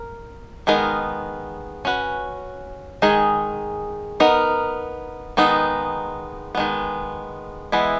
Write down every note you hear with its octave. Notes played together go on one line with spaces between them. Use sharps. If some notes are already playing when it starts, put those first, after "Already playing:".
Already playing: A#4
D#3 G#3 B3 D#4 A#4
C#4 F#4 B4
D#3 G#3 D#4 G#4
B3 D#4 A#4
D#3 G#3 B3 D#4
D#3 G#3 B3
E3 G#3 B3 E4